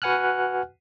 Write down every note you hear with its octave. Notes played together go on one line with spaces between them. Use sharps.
F#4 B4 F#5 G#5 F6 F#6